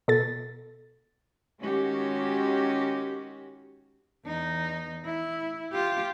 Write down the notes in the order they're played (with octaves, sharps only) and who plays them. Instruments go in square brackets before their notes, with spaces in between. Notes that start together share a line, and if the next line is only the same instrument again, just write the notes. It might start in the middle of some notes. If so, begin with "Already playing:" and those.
[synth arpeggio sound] B2 A4 A6
[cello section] D#3 G#3 C#4 F#4 G4
[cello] E2 D#4
E4
F4 G4